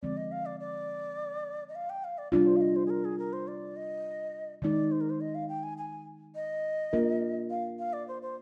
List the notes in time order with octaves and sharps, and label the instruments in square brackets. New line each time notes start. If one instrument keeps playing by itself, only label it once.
[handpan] D3 F3 G#3 C4 [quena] D5
[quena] D#5
F5
D5
D5
D#5
F5
G5
F5
D5
[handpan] C3 G3 D4 F4 [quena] D5
[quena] C5
F5
D#5
C5
G#4
A#4
G#4
A#4
C5
D5
D#5
[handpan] D#3 G#3 D#4 [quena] D5
[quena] C5
A#4
C5
D#5
F5
G5
G#5
G#5
D#5
[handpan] A#3 D4 F4 A#4
[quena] F5
F5
D5
C5
C5